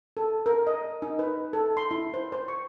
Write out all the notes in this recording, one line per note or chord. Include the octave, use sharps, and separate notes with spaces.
A4
A#4
D#5
D#4
B4
A4
C6
E4
C5
C5
C#6